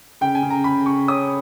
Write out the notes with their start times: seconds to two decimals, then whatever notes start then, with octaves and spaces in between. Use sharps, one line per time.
0.21 C#3 G5
0.35 G#5
0.43 C#3
0.50 A#5
0.64 C#3 B5
0.86 C#3 C#6
1.07 C#4 D#6